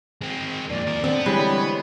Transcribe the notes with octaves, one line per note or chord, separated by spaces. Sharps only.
G#3 C4
F2 A#2 D5
D#2 A#4
D3 B3 C4
E3 G3 G#3 C#5